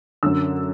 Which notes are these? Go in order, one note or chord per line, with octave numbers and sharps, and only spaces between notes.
F#2 D3 E6